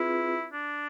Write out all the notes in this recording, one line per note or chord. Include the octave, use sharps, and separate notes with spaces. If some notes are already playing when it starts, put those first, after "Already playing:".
Already playing: C4 E4 F4 G#4 B4
D4